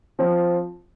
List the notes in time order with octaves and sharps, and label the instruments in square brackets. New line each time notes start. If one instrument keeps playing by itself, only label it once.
[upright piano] F3 C4